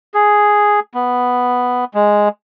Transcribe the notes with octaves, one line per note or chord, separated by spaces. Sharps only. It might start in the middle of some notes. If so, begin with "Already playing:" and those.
G#4
B3
G#3